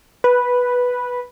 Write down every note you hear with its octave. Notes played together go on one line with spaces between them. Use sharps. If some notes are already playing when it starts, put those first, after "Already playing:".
B4